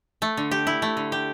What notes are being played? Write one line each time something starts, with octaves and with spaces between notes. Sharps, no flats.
A3
D3
G4
E4
A3
D3
G4